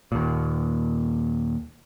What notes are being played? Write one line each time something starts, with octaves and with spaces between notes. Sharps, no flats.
D#2 A#2